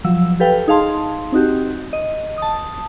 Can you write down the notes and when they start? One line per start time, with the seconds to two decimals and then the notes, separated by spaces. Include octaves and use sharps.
0.04 F3 F#3 E6
0.40 G4 A4 B4 F5 G5
0.68 D#4 G#4 F5 A5 C6
1.32 C4 D#4 F#4 G4
1.93 D#5
2.38 A5 D#6